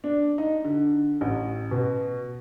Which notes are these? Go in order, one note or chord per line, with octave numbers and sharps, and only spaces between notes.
D4
D#4
D3
A1
B2